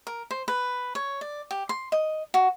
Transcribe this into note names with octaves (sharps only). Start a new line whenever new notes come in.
A#4
C5
B4
C#5
D5
G4
C6
D#5
F#4